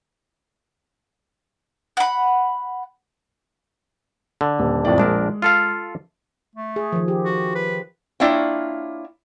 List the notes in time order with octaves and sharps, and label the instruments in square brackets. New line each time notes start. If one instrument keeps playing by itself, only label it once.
[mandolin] F#5 B5
[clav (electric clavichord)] D3
[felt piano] D#1
F2 A2 D5
[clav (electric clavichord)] A#1 D4 A#4 [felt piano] G#3
[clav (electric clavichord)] F4 A4 F5
[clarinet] A3
[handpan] G#4
D#3 F3
G4
[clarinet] F#4
B4
[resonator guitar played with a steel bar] A#3 D4 E4 F4 C#5 G5